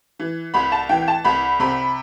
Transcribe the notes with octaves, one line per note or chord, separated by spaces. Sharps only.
E3
C2 B5
A5
E3 G5
A5
C2 B5
C3 B5